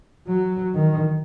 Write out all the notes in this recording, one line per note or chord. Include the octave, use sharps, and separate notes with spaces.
F#3
D#3